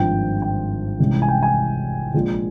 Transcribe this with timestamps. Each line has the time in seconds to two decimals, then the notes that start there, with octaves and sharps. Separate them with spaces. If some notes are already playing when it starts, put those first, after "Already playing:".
Already playing: G#1 G2 F3 G5
0.42 G5
0.99 C2 C3 E3 G#3 C#4
1.22 G#5
1.28 G5
1.43 G#5
2.14 A#1 A#2 F3 G#3